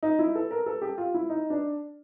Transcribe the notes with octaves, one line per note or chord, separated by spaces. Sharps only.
D#4
E4
A4
A#4
A4
G4
F4
E4
D#4
D4